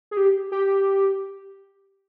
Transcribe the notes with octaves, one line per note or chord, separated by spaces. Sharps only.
G#4
G4
G4